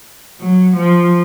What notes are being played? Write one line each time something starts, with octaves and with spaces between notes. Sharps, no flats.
F#3
F3